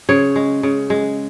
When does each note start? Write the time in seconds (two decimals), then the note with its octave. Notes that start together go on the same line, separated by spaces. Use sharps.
0.09 C#3 C#5
0.36 G#3
0.63 C#3
0.90 G#3